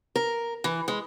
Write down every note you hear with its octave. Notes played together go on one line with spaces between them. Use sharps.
A#4
E3
G#3